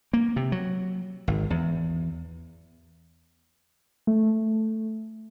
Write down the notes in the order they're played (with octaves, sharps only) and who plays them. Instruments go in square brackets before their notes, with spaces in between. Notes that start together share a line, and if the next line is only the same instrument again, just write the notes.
[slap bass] A#3
C3
F#3
G#1
E2
[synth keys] A3